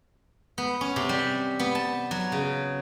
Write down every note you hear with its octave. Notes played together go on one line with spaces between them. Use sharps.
B3
C#4
C3
G3
B3
A5
F#3
C#3